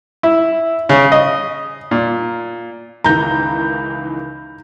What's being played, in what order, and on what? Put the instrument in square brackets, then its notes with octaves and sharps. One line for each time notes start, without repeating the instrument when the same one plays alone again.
[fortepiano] E4
C#3
D#5
A#2
[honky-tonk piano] C#2 D#3 E3 [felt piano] A#5 G6